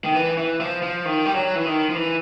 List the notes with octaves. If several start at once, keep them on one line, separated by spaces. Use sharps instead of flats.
D#3
E3
E3
F3
F3
D#3
G3
F#3
E3
D#3
F3
E3